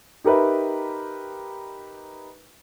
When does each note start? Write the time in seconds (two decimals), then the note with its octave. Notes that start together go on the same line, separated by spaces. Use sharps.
0.24 D#4 G4 A#4 B4 E5